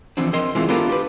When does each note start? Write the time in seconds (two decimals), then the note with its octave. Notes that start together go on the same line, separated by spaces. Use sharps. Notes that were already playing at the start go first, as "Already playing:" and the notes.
0.17 E3 F3 C4 D4
0.33 C4 A#4 D#5 C6
0.55 E3 G#3 C4 E4 F4
0.68 B3 D4 F4 G4 A4 A#4
0.89 G4 B4